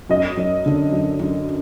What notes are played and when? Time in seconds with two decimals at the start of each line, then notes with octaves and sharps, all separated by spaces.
0.09 F#2 D#5
0.37 F#2
0.66 D3
0.93 F#2
1.20 F#2